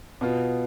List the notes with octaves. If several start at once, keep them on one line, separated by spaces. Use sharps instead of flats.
B2 B3 F4